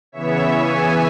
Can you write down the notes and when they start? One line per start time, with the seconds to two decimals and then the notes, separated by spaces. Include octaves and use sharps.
0.12 C#3 E3 B3 C#5 E5
0.54 E5 G#5